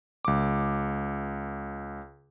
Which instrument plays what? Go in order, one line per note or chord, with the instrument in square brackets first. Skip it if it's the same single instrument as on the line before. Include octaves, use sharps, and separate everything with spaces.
[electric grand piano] C#2 D6